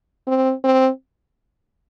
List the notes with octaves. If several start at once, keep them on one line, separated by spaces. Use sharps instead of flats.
C4
C4